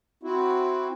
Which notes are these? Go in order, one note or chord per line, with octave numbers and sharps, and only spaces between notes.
C4 E4 F#4